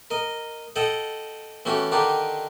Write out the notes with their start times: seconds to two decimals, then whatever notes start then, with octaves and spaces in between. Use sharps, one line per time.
0.10 A#4 D#5
0.76 A4 D#5 F#5 G5
1.65 E3 A3 C#4 F#4 G4
1.92 D3 D#3 D4 D#4 G4